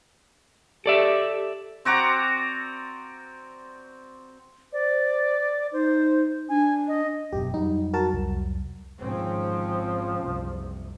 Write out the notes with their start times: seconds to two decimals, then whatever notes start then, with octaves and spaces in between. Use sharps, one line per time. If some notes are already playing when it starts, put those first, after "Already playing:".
0.86 G4 A4 D5 E5
1.85 C4 F#4 D5 A#5
4.73 C5 D5
5.73 D#4 C5
6.49 D4 G#5
6.88 D#5
7.32 F#1 F#2 B2 G4
7.54 F2 F#3 G3 D#4
7.93 F#4 A#4 A5
8.13 C2
9.00 G#1 F3 C4 C#4
10.20 F#1 C2 C3